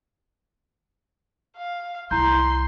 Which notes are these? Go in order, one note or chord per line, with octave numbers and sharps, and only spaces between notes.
F5
C2 E4 A#5 C6 G6